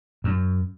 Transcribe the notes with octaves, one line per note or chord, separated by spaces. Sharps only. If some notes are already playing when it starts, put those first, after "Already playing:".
F#2